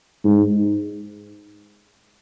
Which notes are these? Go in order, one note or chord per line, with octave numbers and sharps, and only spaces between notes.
G#2